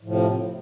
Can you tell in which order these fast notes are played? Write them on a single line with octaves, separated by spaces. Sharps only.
A2 F3 C3